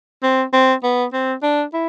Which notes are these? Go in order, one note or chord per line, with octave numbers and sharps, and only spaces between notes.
C4
C4
B3
C4
D4
E4